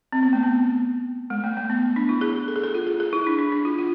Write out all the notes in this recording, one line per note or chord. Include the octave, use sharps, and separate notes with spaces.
C4
B3
A3
B3
G#3
A3
A3
B3
D4
E4
G#4
A4
G#4
A4
F4
G#4
G#4
E4
D4
D4
D4
F4
F4